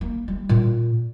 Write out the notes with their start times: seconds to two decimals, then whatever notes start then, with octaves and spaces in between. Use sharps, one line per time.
0.01 A#3
0.28 G3
0.49 A#2